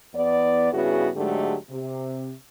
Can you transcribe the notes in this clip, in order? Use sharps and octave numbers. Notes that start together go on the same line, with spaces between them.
E2 B3 D5
G2 C#3 B3 E4 F#4 G#4
G#2 D3 F#3 G#3 A3 G4
C3